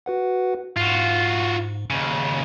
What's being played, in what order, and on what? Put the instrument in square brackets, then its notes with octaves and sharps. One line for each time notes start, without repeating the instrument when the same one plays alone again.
[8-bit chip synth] F#4 B4 F#5
[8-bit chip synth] G#2 [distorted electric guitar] F4 F#4
[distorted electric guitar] D#2 C#3